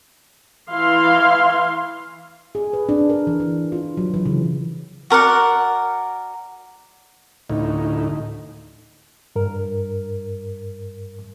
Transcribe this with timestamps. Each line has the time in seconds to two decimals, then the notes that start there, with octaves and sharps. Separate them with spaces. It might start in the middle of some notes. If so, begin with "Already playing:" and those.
0.71 E3 E4 F5 C6
2.55 G#4
2.73 B4
2.89 D4
3.10 A#4
3.27 E3
3.40 E3
3.72 F4
3.97 F#3
4.14 E3
4.26 C#3
5.10 F#4 A#4 D5 F#5
7.49 D2 A2 D#4
9.36 G2 A#4